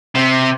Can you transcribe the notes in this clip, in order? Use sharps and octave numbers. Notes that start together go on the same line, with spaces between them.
C3